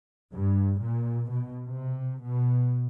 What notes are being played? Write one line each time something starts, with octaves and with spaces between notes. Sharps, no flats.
G2
A#2
B2
C3
B2